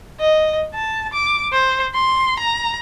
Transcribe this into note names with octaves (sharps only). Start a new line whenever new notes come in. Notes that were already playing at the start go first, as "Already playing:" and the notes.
D#5
A5
D6
C5
C6
A#5